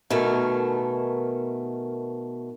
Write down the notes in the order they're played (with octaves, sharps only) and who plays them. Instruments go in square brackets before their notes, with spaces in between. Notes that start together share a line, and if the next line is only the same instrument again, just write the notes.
[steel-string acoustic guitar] B2 D#3 A3 A#4 G#5